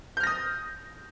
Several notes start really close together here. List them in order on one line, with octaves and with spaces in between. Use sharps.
G6 F6 A#6 D#6